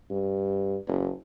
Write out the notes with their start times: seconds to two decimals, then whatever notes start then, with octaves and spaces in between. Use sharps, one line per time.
0.10 G2
0.87 F#1